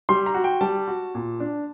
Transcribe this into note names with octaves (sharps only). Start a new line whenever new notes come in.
G3 C6
A#5
F#4
G5
G3 A5
F#4
A#2
D4